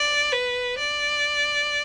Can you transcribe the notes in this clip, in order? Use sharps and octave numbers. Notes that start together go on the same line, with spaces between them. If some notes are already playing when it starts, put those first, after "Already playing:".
Already playing: D5
B4
D5